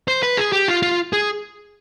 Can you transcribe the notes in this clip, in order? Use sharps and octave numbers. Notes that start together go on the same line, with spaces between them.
C5
B4
G#4
G4
F4
F4
G#4